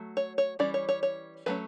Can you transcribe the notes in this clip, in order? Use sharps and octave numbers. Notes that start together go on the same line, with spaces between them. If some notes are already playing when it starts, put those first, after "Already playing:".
Already playing: F#3 A3
C#5
C#5
E3 G3 C#4 D5
C#5
C#5
C#5
F#3 A3 C#4 B4